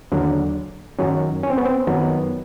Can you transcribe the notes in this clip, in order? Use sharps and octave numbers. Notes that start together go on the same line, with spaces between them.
D#2 D3 F#3 D4
F#2 D#3 F#3 C#4
C#4
C4
B3
C4
F#2 D#3 F#3 B3